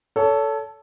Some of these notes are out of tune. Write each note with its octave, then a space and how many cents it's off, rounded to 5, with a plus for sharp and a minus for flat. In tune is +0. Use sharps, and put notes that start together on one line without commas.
A4 +0 C#5 +30